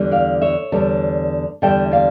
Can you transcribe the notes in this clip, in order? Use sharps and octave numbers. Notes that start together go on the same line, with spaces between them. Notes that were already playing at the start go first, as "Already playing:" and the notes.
Already playing: E2 D3 G3
D5 F5
C#5 E5
E2 D3 G3
E2 D3 G3 E5 G5
D5 F5